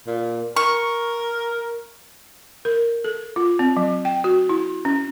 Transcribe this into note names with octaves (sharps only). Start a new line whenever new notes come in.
A#2
A#4 C#6
A#4
A4
F4
C4
F#3
G5
F#4
E4
C#4